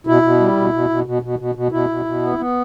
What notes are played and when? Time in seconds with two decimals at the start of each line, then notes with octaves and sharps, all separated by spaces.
0.07 B2 E4
0.22 B2
0.40 G3
0.56 B2
0.73 B2
0.89 B2
1.06 B2
1.22 B2
1.39 B2
1.55 B2
1.72 B2 E4
1.89 B2
2.05 B2
2.22 B3
2.38 B3